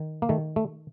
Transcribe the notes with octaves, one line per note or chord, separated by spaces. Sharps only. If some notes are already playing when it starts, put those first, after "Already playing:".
Already playing: D#3
A#3
D#3 A3
A3